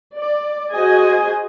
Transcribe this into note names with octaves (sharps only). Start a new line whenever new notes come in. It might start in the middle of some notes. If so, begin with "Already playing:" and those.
D5
F#4 G#4 C5 D#5 G#5